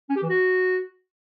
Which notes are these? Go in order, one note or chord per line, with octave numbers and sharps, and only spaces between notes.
C#4
G4
E3
F#4